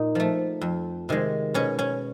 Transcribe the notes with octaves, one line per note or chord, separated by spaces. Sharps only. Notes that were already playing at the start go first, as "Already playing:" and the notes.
Already playing: A#2 D#4
F3 A3
F2
C3 D#3 G#3
B2 C#4
C#4